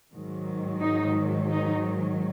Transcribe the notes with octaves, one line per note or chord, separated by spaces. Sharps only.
G#2 D#3 F#3
D#4
D#4